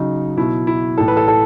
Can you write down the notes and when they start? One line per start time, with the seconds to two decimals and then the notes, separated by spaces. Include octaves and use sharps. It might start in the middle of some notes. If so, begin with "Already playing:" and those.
Already playing: C#3 F#3 D#4
0.37 B2 F#3 E4
0.67 E4
0.98 A2 E3 A4
1.08 B4
1.17 A4
1.28 A4